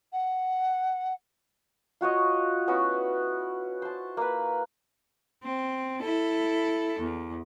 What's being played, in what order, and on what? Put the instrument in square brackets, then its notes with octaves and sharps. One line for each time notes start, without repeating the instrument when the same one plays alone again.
[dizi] F#5
[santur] F4 F#4 C#5 D#5
B3 C#4 E4 F#4
C5 A5
A#3 B4
[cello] C4
E4 A4
E2